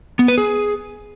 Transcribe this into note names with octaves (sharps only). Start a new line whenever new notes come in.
B3
B4
G#4